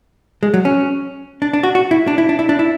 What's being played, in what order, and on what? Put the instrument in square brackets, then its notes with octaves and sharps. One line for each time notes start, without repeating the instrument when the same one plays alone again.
[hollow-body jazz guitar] G#3
F#3
C#4
D4
D4
F#4
F#4
E4
D4
E4
D4
E4
D4
E4